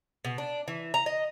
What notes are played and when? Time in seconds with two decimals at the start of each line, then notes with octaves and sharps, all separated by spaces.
0.25 B2
0.38 D4
0.68 E3
0.94 A#5
1.06 D#5